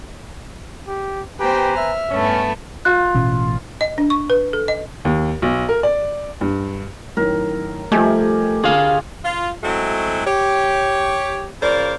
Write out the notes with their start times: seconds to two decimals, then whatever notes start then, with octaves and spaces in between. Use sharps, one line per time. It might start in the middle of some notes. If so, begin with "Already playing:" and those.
0.87 G4
1.40 B3 G4 B4 C5 G5 G#5 A#5
1.77 E5 F6
2.11 G2 A3 B3 C#4
2.85 F4 F#6
3.14 A1 B2 C#4
3.81 D#5
3.98 D4
4.10 C#6
4.30 B4
4.53 A4
4.68 D#5
5.05 D#2
5.42 B1
5.69 A#4
5.83 D5
6.41 G2
7.17 F#2 A2 D#3 A#4
7.92 F3 G3 A3 G4 D#5 G#5
8.64 D3 F4 G#4 F5
9.24 F4
9.63 F#3 G#3 A3 C4 E4 F#4
10.26 G4 C#5
11.62 C#3 F4 A#4 C5 D5